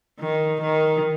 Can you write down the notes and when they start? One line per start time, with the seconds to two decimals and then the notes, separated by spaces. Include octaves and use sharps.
0.20 D#3
0.61 D#3